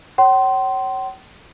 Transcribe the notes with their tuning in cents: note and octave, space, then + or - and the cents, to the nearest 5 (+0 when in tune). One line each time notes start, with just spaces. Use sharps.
C#5 -15 G5 -45 C6 +0